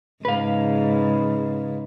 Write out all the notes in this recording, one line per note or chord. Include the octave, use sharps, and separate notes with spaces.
G#2 C#3 B4 F5